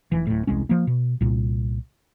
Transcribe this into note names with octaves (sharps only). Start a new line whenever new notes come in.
F1 E3
D1 A2
E1 C2 G#3 C#4
F3 A#3
B2
C2 A#2